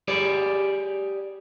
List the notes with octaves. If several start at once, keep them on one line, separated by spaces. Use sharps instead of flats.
G4 G#4 D5